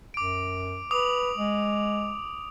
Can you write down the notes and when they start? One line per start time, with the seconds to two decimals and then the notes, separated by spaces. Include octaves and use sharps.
0.14 F#2 D6 D7
0.91 B4 D6 D#6 F7
1.37 G#3